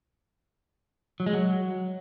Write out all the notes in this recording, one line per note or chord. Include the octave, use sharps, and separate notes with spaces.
F#3
G#3
F#3